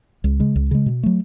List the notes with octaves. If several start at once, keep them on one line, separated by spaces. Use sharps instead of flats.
C#2
C#3 G#3
C#2
C#3 G#3
B2
F#3 A3